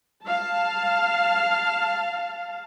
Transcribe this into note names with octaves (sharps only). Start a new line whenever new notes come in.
F5 A5